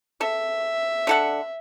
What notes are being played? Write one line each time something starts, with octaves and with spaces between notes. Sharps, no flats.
A4 E5
D3 A4 F#5